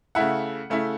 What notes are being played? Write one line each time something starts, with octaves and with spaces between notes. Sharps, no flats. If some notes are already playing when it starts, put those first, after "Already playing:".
C#3 A3 E4 F#5
C#3 A3 E4